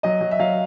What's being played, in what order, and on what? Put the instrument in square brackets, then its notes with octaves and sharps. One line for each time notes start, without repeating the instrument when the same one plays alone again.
[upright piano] F#3 D#5
F#3
E5
F#3 F5